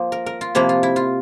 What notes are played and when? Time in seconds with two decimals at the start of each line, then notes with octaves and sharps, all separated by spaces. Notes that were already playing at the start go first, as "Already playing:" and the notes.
Already playing: F3 A#3 C5
0.12 A#4
0.26 A#4
0.41 F4
0.55 C3 F3 A#3 E4
0.69 F4
0.83 E4
0.96 F4